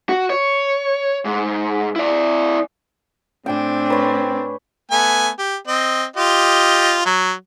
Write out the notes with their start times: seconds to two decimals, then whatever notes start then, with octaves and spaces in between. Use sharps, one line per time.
0.09 F#4
0.30 C#5
1.25 G#2
1.96 E4 D5
3.46 A2 C4 D4 G5 G#5
3.90 B4 C#5 C6
4.91 A3 B3 G#5
5.38 G4
5.67 C4 D#5
6.16 F4 G4 D#5
7.05 F#3